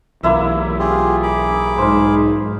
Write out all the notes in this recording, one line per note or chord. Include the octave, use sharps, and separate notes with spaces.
B1 E3 A#3 E4 E5
F4 G4 G#4
G#4 B5 D6
G#2 C5 F5